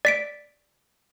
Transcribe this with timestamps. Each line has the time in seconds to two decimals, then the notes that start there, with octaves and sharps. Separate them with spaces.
0.05 D5 B6 D7